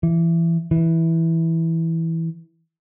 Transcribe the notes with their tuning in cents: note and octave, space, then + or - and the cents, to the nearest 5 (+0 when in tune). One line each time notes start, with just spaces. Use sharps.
E3 +20
E3 -10